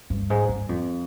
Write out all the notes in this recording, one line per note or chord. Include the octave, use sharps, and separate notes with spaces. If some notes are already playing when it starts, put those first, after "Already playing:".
G2
G#2
G2
F2